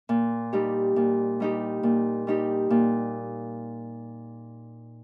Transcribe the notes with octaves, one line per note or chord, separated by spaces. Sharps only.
A#2
G3 D#4 G4
A#2
G3 D#4 G4
A#2
G3 D#4 G4
A#2